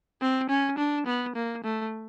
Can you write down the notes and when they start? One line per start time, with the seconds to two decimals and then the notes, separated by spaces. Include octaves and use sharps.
0.21 C4
0.50 C#4
0.78 D4
1.07 B3
1.36 A#3
1.64 A3